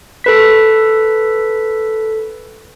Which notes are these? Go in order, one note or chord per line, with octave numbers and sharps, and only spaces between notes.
A4 B4 B6